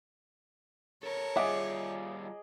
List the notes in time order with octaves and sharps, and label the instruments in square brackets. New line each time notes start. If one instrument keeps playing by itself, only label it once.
[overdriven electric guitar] A4 A#4 [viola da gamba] C#5
[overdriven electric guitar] G3 F4 [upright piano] G#4 D#5 D6 [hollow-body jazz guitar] E5 F#5